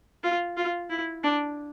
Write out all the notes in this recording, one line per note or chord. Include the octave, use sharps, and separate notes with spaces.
F4
F4
E4
D4